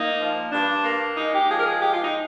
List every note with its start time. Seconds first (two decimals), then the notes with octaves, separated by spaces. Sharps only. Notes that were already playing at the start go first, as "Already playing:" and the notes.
Already playing: A#3 D#4
0.19 F3
0.51 G2 D4
0.84 A#3
1.16 G#3 D#4
1.33 G4
1.49 F3 G#4
1.59 A#4
1.66 G#4
1.81 G#3 G4
1.92 F4
2.03 D#4